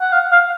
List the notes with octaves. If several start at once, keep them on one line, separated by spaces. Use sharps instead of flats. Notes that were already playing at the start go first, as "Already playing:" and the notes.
F#5
F5
F5